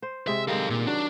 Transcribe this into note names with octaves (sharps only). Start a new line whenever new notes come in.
C5
C3 G#3 E5
G2 D#3 G#3 A4 F5
A#2
F#3 D4